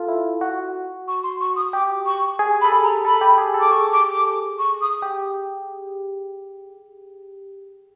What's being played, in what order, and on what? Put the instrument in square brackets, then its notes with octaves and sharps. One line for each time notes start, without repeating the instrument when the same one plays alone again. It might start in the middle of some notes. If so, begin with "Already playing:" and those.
Already playing: [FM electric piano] F4 A4
E4
F#4
[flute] C#6
C6
C#6
D#6
[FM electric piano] G4 [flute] D6
[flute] C#6
[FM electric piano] G#4
[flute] B5
[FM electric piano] A4
G#4
[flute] A#5
[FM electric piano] A4 [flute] B5
[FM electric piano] G4
G#4
A4
[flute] D6
[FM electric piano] G#4 [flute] C#6
[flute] D6
D6
C#6
D#6
[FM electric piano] G4